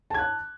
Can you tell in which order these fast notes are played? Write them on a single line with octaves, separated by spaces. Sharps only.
A5 G#6 F#6